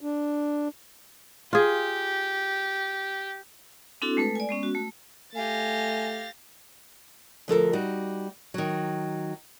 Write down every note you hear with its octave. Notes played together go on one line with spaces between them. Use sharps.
D4
F4 G4 G#4
C4 D4 E4 F#4 A4
G#3 A3 A4 B4
D5 G#5
G#3 B3 C#4
F#4
A3
A3 G4 F5 G#5 A6 A#6
D2 F3 A4 A#4
G3 D#4 F#4
D#3 F#3